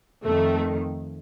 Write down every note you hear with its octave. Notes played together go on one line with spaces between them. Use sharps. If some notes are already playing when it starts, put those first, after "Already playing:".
F2 D#3 A3